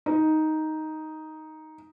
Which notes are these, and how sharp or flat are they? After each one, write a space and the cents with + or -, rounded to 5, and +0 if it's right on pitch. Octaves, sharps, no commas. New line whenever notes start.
D#4 +5